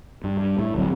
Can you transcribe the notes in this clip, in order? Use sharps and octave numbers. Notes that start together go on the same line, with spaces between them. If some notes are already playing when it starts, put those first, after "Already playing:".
G2
G2
A2
D1 F#3 C4